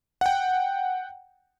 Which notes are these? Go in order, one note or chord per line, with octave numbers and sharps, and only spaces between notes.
F#5 G5